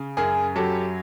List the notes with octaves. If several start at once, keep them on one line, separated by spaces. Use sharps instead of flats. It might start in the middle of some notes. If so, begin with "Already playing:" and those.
Already playing: C#3
F#2 G#4 A#4
F#3 G4 A4